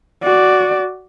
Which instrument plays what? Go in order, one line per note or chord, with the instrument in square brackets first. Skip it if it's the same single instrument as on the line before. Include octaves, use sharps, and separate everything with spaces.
[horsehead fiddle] F#4 D5